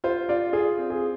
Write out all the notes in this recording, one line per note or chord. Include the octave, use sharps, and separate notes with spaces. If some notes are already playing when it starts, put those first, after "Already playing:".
F4 C5
F4 D5
F4 G#4
C4
G#4